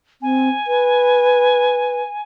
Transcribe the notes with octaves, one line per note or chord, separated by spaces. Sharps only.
C4 G#5
B4